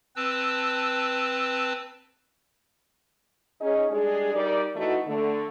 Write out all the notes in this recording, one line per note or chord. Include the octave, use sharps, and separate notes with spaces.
C4 B4 A5 E6
C#4 D#4 G#4
G3 G#3 D4 G#4
G3 D#4 A#4 D5
E3 A3 D#4 F#4
D3 A3